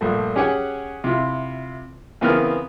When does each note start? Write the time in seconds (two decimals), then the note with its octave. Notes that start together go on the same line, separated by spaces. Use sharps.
0.01 A#1 G2 A3
0.36 C#4 G4 G#4 C#5 F#5 G#5
1.04 C3 E4 F4
2.21 C#3 E3 B3 C4 A#4 F6